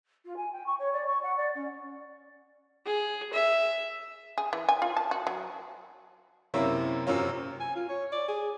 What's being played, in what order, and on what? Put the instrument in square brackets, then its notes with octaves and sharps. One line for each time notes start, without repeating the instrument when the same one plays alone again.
[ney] F4
G#5
G5
C#6
C#5
D5
C#6
F#5
D5
C#4
[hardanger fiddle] G#4
E5
[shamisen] G#4
E3
G#5
F4
A5
F#4
F#3
[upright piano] F#2 C3 A#3 C4 C#4 E4
F#2 C3 F#3 C4 C#4 F4
[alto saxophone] G#5
F4
C#5
D5
G#4